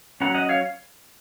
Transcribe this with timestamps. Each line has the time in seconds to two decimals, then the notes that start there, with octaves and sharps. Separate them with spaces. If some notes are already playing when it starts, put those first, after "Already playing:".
0.21 F#3 C#4 F#5 A#5
0.34 D#5 F#5
0.49 C#5 F5